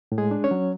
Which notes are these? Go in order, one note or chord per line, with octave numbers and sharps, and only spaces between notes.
A2
G#3 G#4
D4
C#4 C#5
F#3